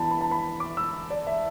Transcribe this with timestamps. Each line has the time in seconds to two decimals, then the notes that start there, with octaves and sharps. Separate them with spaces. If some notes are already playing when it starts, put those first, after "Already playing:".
Already playing: E2 E3 B3 D4 A5 B5
0.11 B5
0.21 A5
0.31 B5
0.60 D6
0.77 E6
1.10 D5
1.27 E5